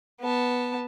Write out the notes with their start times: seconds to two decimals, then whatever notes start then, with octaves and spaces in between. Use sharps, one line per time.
0.21 B3 A5